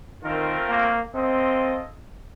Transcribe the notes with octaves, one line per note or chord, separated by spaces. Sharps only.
D#3 A3 C4 F4 A#4
A#3
A#3 C4 F4 A4 D#5